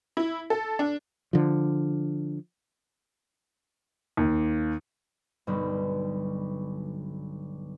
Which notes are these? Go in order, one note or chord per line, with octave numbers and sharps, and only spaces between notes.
E4
A4
D4
D3 F3
D#2
B1 G2 B2 D3 F#3 G3